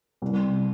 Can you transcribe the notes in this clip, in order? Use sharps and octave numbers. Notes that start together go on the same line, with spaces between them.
C2